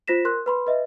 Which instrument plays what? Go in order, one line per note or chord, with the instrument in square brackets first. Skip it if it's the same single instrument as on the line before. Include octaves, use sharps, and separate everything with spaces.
[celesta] F4 C5 A#6 B6 E7
A#4 C6 F#6
B4 B5 C6
B4 D#5 E5